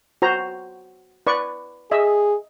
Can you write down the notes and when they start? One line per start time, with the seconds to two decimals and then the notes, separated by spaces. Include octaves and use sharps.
0.22 F#4 C5 A#5
1.27 B4 D5 C#6
1.91 G#4 D#5 E5